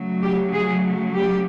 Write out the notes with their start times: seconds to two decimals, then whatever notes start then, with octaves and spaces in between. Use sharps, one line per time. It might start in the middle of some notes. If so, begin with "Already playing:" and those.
Already playing: C#3 F#3 A3
0.21 G4
0.52 G#4
1.15 G4